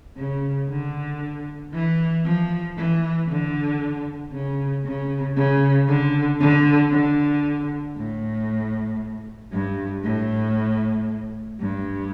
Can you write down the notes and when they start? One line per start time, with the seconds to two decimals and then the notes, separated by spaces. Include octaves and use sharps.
0.17 C#3
0.69 D3
1.73 E3
2.25 F3
2.76 E3
3.29 D3
4.33 C#3
4.85 C#3
5.36 C#3
5.88 D3
6.40 D3
6.92 D3
7.97 A2
9.52 G2
10.04 A2
11.60 G2